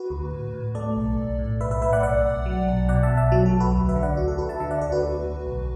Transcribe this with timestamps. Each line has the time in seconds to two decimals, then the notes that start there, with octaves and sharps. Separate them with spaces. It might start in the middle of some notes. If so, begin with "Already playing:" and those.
Already playing: F#4 B4
0.10 D2
0.32 A2
0.54 A2
0.75 A3 A4 D5
0.96 B1
1.18 B1
1.39 A2
1.60 B1 B4 E5
1.71 B4 E5
1.82 A2 B4 E5
1.93 D5 F#5
2.03 B1 D5 F#5
2.25 B1
2.46 F#3
2.67 B1
2.89 B2 D5 F#5
3.03 E5 A5
3.10 B1
3.17 E5 A5
3.32 F#3 F#4
3.46 A4
3.53 B1
3.60 F#4 B4
3.75 D2
3.89 B4 E5
3.96 D3
4.03 D5 F#5
4.17 D2 F#4
4.28 A4
4.38 D2 F#4 B4
4.49 E5 A5
4.60 D3 E5 A5
4.71 D5 F#5
4.81 D2 A4 D5
4.92 F#4 B4
5.03 D2
5.25 D2
5.46 B1